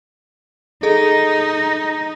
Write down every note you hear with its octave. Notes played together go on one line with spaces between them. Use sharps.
D#4 G#4 A4 D#5